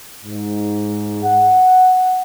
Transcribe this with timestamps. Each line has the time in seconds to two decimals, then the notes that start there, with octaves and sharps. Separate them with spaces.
0.25 G#2
1.23 F#5